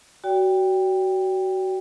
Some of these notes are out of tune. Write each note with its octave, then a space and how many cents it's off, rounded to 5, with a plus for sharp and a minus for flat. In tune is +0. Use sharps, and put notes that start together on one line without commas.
F#4 +25 D5 -40 G5 +10